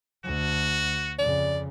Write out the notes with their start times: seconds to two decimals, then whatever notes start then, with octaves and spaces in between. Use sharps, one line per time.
0.25 D2 F#4
1.19 F2 C#3 D5